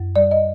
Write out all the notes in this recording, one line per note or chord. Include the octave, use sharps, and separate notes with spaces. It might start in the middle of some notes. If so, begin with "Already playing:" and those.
Already playing: F#2
G3 D5
D#5